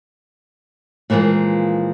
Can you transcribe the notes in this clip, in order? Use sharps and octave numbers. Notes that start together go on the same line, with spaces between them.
A#2 E3 F3 G#3 A#3